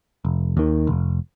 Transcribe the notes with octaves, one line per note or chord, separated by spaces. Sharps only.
F1
D#2 D#3
F1